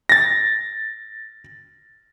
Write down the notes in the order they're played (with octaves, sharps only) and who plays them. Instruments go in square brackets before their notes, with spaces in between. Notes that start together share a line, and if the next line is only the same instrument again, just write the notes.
[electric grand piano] A6 A#6